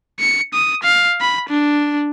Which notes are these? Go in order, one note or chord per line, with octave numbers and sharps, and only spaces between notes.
C#7
D#6
F5
B5
D4